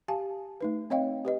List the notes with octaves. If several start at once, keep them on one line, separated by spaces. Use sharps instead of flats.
G4 F5 G#5 A5
A3 D#4 B4
C4 C#5 D#5 F5 G5
G4 B4 D#5